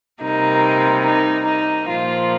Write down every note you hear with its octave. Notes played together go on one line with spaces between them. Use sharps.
C3 G3 A#3 D#4
D#4
D#4
A#2 F3 A#3 F4